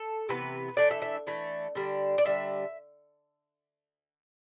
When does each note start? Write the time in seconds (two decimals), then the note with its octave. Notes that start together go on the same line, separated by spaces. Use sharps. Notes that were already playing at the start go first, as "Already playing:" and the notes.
Already playing: A4
0.29 C3 E3 B3 B4
0.77 E3 A3 D4 D5
0.91 E5
1.02 E5
1.27 E3 A3 D4
1.75 D3 G3 D4
2.18 D5
2.25 D3 G3 D4 E5